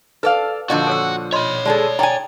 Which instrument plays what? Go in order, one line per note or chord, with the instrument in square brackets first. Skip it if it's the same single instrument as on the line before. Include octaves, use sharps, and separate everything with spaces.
[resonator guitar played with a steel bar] A4 D5 F5 [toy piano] B4
[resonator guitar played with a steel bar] A#2 D3 F3 [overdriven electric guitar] F#4 [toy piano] D#5 A5
[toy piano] A4 C#5 E6
[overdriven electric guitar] C#5 B5 [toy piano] D#5 C6
[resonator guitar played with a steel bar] G#3 G#4 A4 [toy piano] D5 A5
[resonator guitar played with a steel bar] D5 G#5 [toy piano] G5 A#5